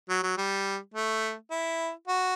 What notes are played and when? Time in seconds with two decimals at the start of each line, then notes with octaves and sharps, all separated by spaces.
0.09 F#3
0.23 F#3
0.37 G3
0.94 A3
1.51 E4
2.07 F#4